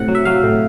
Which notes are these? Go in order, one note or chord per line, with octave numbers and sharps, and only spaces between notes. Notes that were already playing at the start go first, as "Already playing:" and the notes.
Already playing: A2 C3 F#5
F#3
E5
F#3 F5
A2